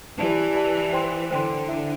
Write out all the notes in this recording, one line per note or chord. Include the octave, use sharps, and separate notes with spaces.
E3 G4 D5 A5
G4 D5 A5
C5 G5 C6
D3 C5 G5 C6
E4 A4 E5